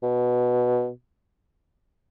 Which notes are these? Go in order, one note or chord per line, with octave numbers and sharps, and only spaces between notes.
B2